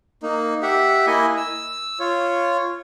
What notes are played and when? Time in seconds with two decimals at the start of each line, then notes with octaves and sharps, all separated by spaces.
0.23 A#3 D#4
0.62 G4 E5 F#5
1.07 A#3 E4 D#5 G#5
1.37 E6
2.00 F4 C#5